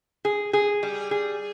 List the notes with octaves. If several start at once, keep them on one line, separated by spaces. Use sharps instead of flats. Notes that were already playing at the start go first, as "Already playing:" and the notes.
G#4
G#4
G3
G#4